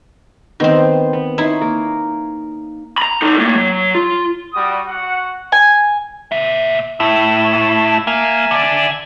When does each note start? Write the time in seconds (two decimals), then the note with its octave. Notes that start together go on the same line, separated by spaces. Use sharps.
0.60 D#3 B3 C4 C5
1.13 B3
1.38 D#4 E4 C#5 C6
1.61 A#3
2.98 A#5 B5
3.22 D#4 A4
3.38 A2 A#3
3.56 F#3
3.95 F4
4.54 G3 F#4 D#6
4.88 F#4 F#5
5.52 G#5
6.32 A#2 E5
7.00 A2 E4 E5
8.07 A#3 E5 G#5
8.51 D3 D5